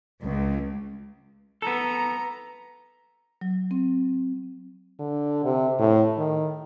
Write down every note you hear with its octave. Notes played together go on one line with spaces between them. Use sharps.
C#2
B3 A4 A#5
F#3
C4
D3
C3
A2
D#3